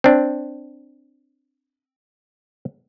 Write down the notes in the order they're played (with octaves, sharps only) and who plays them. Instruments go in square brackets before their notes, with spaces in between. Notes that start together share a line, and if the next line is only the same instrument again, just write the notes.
[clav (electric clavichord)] C4 D4